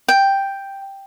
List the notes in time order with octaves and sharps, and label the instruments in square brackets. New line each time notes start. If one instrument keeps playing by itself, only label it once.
[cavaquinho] G5